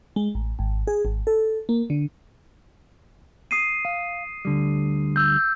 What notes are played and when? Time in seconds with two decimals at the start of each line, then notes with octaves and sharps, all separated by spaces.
0.16 G#3
0.35 A1
0.59 G#1
0.87 G#4
1.05 G#1
1.27 A4
1.69 A#3
1.90 D3
3.51 D#6 C7 D#7
3.85 F5
4.45 D2 D3 G3
5.16 E6 G6